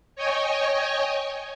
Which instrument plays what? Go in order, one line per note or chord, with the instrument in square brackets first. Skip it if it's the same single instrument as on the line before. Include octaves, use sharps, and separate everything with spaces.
[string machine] C#5 D#5 G5 G#5 C#6